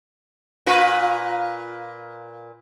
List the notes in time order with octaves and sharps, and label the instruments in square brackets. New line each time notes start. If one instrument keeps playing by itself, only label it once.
[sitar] A#2 F4 B4